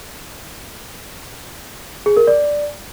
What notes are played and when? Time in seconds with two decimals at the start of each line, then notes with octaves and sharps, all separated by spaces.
2.06 G#4
2.17 A#4
2.27 D5